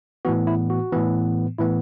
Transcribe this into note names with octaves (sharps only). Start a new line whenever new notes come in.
A2 E3 B3 F#4
E4
F#4
A2 E3 B3
A2 E3 B3 E4